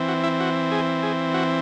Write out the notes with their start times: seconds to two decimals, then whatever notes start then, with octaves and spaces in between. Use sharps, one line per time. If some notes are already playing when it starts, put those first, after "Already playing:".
Already playing: E3 C4
0.08 F#4
0.23 E4
0.40 F#4
0.71 G#4
1.03 G#4
1.34 F#4